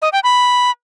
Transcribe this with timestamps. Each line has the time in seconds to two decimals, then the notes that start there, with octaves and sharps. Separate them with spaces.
0.02 D#5
0.13 G5
0.24 B5